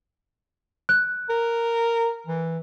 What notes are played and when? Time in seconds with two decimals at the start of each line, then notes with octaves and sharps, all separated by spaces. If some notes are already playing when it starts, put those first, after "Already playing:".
0.89 F#6
1.29 A#4
2.27 E3